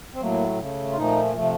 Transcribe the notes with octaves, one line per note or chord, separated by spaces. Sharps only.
C4
A2 F#3 A3 A#3
C#3 A3
F4
A#2 F3 A3 D#4
C3 F3 A3